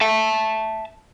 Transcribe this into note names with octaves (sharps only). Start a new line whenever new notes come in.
E5 A5